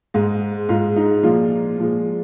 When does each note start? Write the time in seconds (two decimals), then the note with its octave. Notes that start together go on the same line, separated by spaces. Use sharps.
0.14 G#2 G#3
0.69 G#2 G#3 F4
0.96 D#4
1.23 A#2 F3 G#3 F4
1.78 A#2 F3 G#3